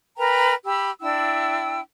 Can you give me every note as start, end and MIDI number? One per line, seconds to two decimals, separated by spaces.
0.17 0.54 70
0.17 0.54 71
0.17 0.54 79
0.17 0.54 82
0.66 0.91 67
0.66 0.91 83
0.66 0.91 88
1.00 1.80 62
1.00 1.80 64
1.00 1.80 79
1.00 1.80 88